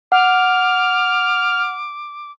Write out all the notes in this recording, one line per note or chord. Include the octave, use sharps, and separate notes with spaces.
F#5 D6 F6